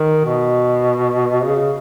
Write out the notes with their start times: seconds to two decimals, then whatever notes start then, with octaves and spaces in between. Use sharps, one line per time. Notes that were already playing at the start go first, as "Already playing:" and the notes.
Already playing: D#3
0.25 B2
1.44 C#3